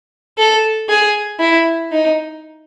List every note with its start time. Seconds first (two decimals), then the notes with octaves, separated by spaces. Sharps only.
0.38 A4
0.89 G#4
1.40 E4
1.92 D#4